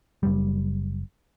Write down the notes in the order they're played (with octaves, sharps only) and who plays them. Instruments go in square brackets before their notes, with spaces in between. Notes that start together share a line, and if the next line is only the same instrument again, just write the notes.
[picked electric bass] F#1 G3